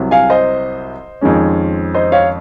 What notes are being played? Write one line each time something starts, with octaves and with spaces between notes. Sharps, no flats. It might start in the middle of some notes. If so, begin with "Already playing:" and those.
Already playing: C2 C3 F#3
F5 G#5
C5 D#5
F2 D#3 G#3 C#4
C5 D#5
C#5 F5